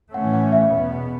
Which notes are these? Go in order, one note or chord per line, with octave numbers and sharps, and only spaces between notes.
A2 E3 A3 C#4 F#5
F#5
E5
E2 B2 B3